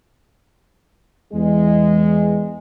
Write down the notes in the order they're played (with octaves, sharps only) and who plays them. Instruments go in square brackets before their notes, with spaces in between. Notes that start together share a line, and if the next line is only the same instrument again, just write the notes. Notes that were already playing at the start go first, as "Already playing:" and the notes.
[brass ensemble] E2 G#3